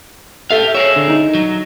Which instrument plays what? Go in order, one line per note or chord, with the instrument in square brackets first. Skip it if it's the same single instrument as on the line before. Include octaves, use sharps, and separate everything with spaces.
[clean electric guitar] G4 F5 [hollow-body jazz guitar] A4 E5
[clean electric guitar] G#4 A#4 E5 [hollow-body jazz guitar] C#5
[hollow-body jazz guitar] D3
D#4
[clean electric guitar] F#3